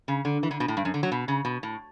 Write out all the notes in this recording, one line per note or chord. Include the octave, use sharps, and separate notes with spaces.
C#3
D3
E3
D3
B2
A2
G2
F#2
D3
F#3
B2
C#3
B2
A2